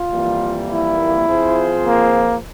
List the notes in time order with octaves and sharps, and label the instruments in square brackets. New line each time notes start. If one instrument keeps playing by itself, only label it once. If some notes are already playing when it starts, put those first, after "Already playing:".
Already playing: [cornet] F4
[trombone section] F2 E3 G3 A#3
[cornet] E4
[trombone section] F3 C4 F4 G#4 C5
[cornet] A#3